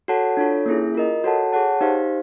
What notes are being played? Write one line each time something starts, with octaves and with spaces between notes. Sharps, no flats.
F#4 A4 C#5 F#5 A5
D4 F4 A4 C#5
A#3 C#4 E4 G#4
F4 A#4 D#5
F#4 A4 C#5 F#5 A5
G#4 C#5 F#5 A5
D#4 G4 C5 F5